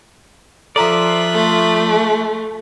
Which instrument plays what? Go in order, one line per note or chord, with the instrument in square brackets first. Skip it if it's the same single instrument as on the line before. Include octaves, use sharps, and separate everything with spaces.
[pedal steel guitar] F3 D5 [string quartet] F4 E5 F#6 [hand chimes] A4 A#5
[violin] A3